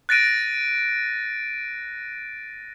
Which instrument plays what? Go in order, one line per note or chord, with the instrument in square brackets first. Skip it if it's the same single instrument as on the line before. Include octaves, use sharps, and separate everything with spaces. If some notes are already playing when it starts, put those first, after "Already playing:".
[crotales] F#6 A6 A#6 D7 D#7